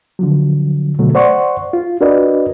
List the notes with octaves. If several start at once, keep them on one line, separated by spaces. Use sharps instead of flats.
D3 F3 F#3
B2 D3 F#3 A3
C5 D5 F#5 C6 C#6
F4
D4 F#4 A#4 B4 D5 D#5